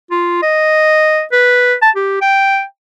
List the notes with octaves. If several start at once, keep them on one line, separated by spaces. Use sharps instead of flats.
F4
D#5
B4
A5
G4
G5